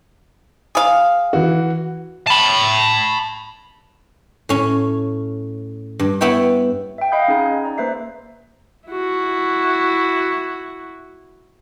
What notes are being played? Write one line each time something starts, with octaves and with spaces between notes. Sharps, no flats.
G#4 F5
E3 F#4
A5 B5
A2 C#4
G2
B3 E4 C#5 E5 G5
E5 G5
D#5 F5 F#5 B5 D#6 G6
C#4 D#4 G#4 G#5 B5
D5 A#5
A#3 B4 C5 E5 C7
E4 F#4